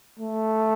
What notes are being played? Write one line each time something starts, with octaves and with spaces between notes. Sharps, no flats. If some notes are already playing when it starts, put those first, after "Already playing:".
A3